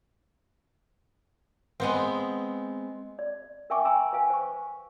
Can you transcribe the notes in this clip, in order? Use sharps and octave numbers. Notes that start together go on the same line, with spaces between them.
G#3 B3 C4
D5
A#4 E5 G5 G#5 C#6 D6
G5 G#5 A#5 C6 D6 E6
B4 F5 G#5
C5 C#6